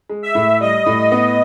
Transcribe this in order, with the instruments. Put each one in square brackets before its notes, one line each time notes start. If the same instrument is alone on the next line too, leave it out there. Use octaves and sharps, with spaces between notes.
[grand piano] G#3
[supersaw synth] E5
[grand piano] A2
[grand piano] G3 [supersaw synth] D#5
[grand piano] A2
B3